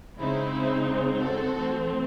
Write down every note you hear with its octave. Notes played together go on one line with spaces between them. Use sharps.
C#3 G#3 C4 D#4 E4
F#4 A4
E3 A3 C4